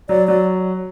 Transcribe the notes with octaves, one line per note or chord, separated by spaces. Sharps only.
F#3 D5
F#3 D5